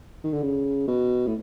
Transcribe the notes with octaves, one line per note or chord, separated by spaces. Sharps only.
D#3
D3
C#3
B2
A2